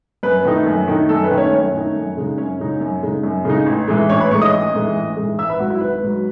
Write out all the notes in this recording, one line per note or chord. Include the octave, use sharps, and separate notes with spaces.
F#2 B4
D#3 A3 D#4
F#2
D#3 A3 D#4
F#2 A4
B4
D#3 A3 D#4
C#4 C#5
F#2 C#4 C#5
D#3 A3 D#4
F#2
C#3 G#3 D#4
F#2 C#4 C#5
C#3 G#3 D#4
F#2
C#3 G#3 D#4
F#2
C#3 G#3 D#4
A1
G#2 E3 G#3
A1 C#4 C#5
B4 B5
G#2 E3 G#3 C#5 C#6
D#5 D#6
A1
G#2 E3 G#3
A1
G#2 E3 G#3
G#1 E5 E6
B4 B5
G#2 F#3 F#4 F#5
E4 E5
G#1 B4
G#2 F#3